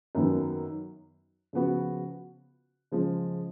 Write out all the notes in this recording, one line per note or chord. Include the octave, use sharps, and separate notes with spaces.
F#2 D#3 F#3 B3
C#3 F3 B3 F#4
C#3 F3 G#3